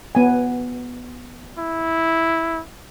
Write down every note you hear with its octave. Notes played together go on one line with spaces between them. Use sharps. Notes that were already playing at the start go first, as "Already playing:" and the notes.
B3 G#5
E4